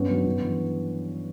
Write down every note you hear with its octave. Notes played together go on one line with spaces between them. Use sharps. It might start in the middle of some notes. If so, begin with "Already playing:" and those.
Already playing: G2 B3 C#4
D#3 F#3
G2
E3